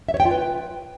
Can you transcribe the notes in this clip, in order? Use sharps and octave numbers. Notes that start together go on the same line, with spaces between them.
E5
C#5
G5
F4
B4